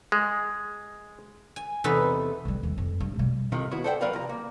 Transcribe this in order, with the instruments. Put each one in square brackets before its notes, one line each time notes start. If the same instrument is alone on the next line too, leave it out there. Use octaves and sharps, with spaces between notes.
[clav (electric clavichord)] G#3
[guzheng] G#5
E2 C3 A3 D#4 A4 B4
[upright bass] F#3 G3
D#2
F2
G2
B2 G3
[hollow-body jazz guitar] D#2 A2 C3 D#3 F3
D#2 B3 E4 F#4 C#5
A4 C5 D5 E5 F#5 G5
F#3 A#4 B4 D5 F5
C2 F3 A#5
A#3